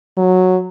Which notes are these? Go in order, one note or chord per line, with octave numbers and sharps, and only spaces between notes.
F#3